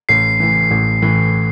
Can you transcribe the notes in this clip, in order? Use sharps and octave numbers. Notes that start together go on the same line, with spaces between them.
A1 C7
A2 E3
A1
A2 E3